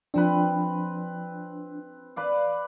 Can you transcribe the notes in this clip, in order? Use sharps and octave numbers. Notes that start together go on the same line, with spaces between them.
F3 C4 D4 B4
B4 D5 F5